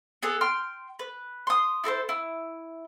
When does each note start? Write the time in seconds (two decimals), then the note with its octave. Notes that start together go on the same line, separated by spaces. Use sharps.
0.23 B3 G#4 A4
0.41 G5 C6 F6
0.99 B4
1.47 C6 D#6
1.84 E4 A4 A#4 C5
2.09 E4